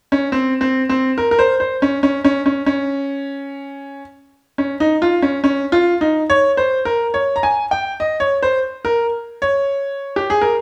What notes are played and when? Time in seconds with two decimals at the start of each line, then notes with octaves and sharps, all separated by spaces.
0.12 C#4
0.32 C4
0.61 C4
0.89 C4
1.18 A#4
1.31 A#4
1.39 C5
1.60 C5
1.82 C#4
2.03 C#4
2.24 C#4
2.46 C#4
2.66 C#4
4.58 C#4
4.80 D#4
5.02 F4
5.22 C#4
5.44 C#4
5.72 F4
6.01 D#4
6.30 C#5
6.57 C5
6.85 A#4
7.14 C#5
7.36 A#5
7.43 G#5
7.71 G5
8.00 D#5
8.20 C#5
8.43 C5
8.85 A#4
9.42 C#5
10.16 G4
10.30 G#4
10.41 A#4